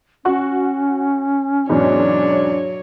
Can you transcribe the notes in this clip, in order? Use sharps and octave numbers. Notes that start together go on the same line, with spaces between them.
C#4 F#4 F#5 C#6
E2 G#2 B2 F#3 D4 C#5